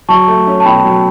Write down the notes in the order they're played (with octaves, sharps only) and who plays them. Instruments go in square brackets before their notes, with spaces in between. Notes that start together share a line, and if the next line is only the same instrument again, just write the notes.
[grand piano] F#3 [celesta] A5 C#6
[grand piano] A3
C#4
[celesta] A5
[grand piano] B2 [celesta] G5 B5
[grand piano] F#3